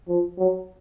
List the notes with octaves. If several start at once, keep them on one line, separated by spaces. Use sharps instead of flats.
F3
F#3